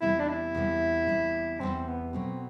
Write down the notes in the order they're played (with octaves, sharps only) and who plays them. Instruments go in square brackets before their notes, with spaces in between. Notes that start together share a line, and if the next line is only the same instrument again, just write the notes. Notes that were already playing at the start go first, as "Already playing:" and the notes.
[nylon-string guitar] E2 C3 G3 [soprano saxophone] E4
[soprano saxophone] D4
E4
[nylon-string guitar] E2 C3 G3
E2 C3 G3
[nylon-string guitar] E2 C3 G3 [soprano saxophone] C4
[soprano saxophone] B3
[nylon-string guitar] B2 F#3 A3 [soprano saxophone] C4